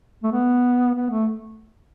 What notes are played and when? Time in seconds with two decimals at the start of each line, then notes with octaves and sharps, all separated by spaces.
0.24 A3
0.32 B3
0.94 B3
1.10 A3